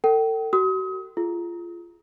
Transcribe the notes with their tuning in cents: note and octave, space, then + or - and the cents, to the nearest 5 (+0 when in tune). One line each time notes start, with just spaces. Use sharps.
A4 +35 G5 -35
F#4 +35 D#6 +35
F4 -20 G#4 +20